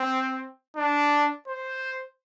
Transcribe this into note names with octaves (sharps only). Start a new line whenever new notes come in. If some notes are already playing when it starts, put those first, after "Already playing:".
Already playing: C4
D4
C5